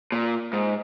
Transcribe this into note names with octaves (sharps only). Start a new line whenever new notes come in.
A#2
G#2